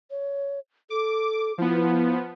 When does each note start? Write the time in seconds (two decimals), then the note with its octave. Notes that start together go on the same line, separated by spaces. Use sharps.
0.10 C#5
0.90 A4 D6
1.58 F3 B3 E4